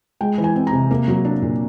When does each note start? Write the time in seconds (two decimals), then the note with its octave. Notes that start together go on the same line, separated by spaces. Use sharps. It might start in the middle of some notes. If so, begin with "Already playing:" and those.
0.21 G#3 G5
0.38 E3
0.44 G#5
0.56 C4
0.67 A#5
0.73 C3
0.91 A#3
1.08 F#3
1.25 D4
1.42 A#2